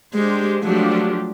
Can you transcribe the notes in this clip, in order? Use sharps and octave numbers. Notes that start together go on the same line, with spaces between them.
G#3 D4 G4 C5
F3 F#3 A3 D4 G4